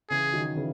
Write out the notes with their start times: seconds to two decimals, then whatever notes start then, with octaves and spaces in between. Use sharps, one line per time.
0.10 C#3 E3 G#4
0.33 D#3 F#3
0.57 C#3 E3